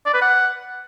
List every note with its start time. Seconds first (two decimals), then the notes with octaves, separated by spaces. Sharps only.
0.06 D5
0.14 B4
0.21 F#5